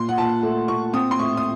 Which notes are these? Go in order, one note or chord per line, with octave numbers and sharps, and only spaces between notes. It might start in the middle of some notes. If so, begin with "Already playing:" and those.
Already playing: A#2 C6
F#5
A#2 A5
A3
A#2 C#6
C4 D#6
C6
A2 C#6
D#6